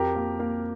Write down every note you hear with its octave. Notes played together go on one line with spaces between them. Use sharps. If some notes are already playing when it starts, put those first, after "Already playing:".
Already playing: F2 G4 A#4
A#3
A#3